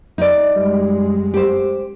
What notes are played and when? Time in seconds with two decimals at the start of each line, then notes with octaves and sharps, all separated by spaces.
0.18 D#4 D5
0.56 F#2 G3 G#3
1.34 G4 C5